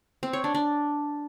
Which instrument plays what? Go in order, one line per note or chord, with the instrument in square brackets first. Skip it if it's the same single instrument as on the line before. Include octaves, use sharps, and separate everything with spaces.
[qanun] C4
C#5
D4
D4